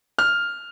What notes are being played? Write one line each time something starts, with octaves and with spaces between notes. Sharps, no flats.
F6